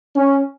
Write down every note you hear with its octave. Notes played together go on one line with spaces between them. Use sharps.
C#4